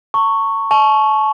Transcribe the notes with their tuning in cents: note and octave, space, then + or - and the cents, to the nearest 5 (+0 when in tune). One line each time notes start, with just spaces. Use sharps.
A5 +45 C#6 +0
A5 -35 C#6 +0